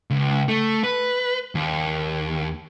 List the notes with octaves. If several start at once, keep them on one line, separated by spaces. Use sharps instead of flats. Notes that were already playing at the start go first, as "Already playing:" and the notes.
C#2
A3
B4
D#2